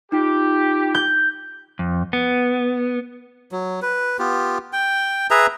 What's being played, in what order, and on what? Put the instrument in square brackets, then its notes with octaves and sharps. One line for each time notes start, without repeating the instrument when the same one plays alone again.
[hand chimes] D#4 F4 [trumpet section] G4
[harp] G6
[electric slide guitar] F2
B3
[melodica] F#3
B4
B3 F4 G4
G5
G#4 B4 E5 A#5